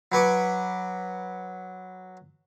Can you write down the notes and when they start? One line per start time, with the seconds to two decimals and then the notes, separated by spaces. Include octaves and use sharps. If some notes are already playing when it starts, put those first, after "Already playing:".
0.12 F#3 B4 C#6 D6